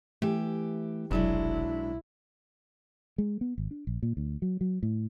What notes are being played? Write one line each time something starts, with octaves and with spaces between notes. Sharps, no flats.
E3 A3 G4
F1 B1 F#3 G#3 D4 E4
G#3
B3
G#1
D4
A#1
A#2
D2
F#3
F#3
A2